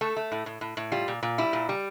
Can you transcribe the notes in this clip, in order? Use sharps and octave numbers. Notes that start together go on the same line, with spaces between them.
A3 A4
A3
A2
A2
A2
A2
G3 F4
A#2
A#2
G3 E4
A#2
G3